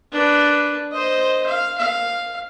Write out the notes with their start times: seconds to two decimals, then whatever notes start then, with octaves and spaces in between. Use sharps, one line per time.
0.12 D4 B4
0.92 C5 D#5
1.47 F5
1.78 F5